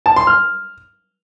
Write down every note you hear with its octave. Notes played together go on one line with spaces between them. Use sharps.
A5
C6
F6